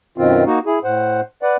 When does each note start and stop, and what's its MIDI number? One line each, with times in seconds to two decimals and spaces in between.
0.18 0.44 42
0.18 0.44 47
0.18 0.44 51
0.18 0.44 60
0.18 0.44 65
0.46 0.59 58
0.46 0.59 63
0.46 0.59 66
0.66 0.79 64
0.66 0.79 68
0.84 1.21 45
0.84 1.21 72
0.84 1.21 78
1.42 1.57 71
1.42 1.57 74
1.42 1.57 78